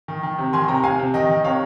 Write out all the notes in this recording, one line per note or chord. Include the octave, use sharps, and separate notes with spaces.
D#3
D#3
C3
D#3 G#5 C6
C3 G5 A#5
C3 F5 G#5
C3
D#3 D#5 G5
D#3
C3 C#5 F5